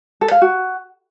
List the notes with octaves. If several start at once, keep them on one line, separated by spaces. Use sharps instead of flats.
A4
F5
F#4